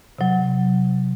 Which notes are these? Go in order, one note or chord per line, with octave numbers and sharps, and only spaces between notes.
C3 F#3